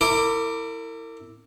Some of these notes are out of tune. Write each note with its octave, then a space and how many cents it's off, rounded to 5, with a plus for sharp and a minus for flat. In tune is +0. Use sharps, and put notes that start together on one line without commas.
E4 +0 A#4 -40 D6 +0